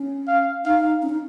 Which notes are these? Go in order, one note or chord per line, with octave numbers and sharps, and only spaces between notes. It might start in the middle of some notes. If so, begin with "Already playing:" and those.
Already playing: C#4
F5
D#4 F5
C#4
D#4